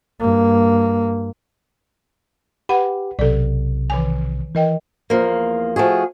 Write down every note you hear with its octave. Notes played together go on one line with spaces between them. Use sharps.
G2 A#3
G4 B4 F#5 B5
B1 C3 A4 D5
D#3 E3 G#5
E3 A#4 D#5 G5
E2 F3 A#3
F3 A3 F#4 G#4